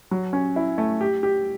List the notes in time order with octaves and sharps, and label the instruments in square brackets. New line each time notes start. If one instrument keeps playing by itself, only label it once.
[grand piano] F#3
C#4
E4
A3
G4
G4